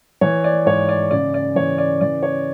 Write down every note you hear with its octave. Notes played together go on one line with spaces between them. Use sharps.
E3 C#5
D5
G#2 C#5
D5
C#3 D5
D5
E3 C#5
D5
E3 D5
C#5